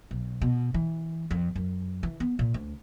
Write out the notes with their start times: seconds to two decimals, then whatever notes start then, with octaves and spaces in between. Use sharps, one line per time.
0.11 B1
0.42 B2
0.74 E3
1.31 F2
1.55 F#2
2.03 E3
2.20 B3
2.39 A#2
2.54 D2